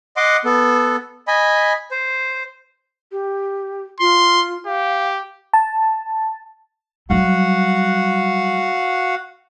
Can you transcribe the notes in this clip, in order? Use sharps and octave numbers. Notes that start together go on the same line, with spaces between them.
D#5 F#5 C6 D6
B3 A4
D#5 G#5 B5
C5
G4
F4 C6
G4 F5
A5
F#3 G3 F#4 F5 F#5